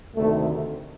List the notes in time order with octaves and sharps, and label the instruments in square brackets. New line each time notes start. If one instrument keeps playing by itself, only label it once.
[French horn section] D2 C3 D#3 A3